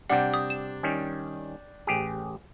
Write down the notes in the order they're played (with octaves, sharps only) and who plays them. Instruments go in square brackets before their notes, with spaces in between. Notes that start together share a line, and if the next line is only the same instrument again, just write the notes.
[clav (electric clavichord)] C3 G3 [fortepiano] D4 G5 [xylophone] F#5
[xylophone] D#6
E7
[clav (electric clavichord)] D#3 G3 C#4
A1 G4 G#4